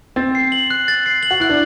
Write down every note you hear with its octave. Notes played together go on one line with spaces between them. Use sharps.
C4 A6
C7
F#7
F#6
A6
C7
F#7
F#4
E4 F#6
D4